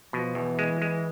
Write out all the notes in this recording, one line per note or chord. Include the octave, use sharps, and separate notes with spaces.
B2 F3
E2 E3
G#3
G#3